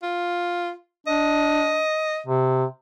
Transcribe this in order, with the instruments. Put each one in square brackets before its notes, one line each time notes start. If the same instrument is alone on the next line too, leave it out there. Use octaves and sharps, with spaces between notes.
[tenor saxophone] F4
[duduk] D4 [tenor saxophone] D#5
[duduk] C3